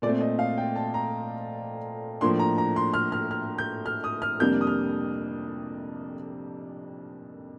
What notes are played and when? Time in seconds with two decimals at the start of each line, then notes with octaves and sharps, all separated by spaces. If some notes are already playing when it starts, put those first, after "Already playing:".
0.02 A#2 A3 C4 D5
0.21 D#5
0.39 F5
0.58 G5
0.76 A5
0.94 A#5
2.21 A2 F3 A#3 D4 C6
2.39 A#5
2.58 A#5
2.76 C6
2.94 F6
3.12 F6
3.31 F6
3.58 G6
3.86 F6
4.04 D#6
4.22 F6
4.40 F2 C3 G3 A#3 D4 G6
4.61 D#6
4.67 F6